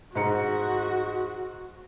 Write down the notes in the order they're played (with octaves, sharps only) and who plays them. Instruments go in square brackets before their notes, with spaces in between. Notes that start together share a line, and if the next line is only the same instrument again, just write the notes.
[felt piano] G#2 A#5 C#7 [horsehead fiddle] F#4